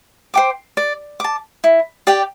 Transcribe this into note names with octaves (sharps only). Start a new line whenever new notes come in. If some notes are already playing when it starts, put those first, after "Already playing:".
C5 G5 D6
D5
A5 D6
E4
G4 D5 G5